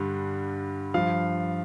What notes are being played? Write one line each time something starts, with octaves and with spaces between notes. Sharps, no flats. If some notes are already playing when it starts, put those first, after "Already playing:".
Already playing: G2 D3 G3
G2 F3 F5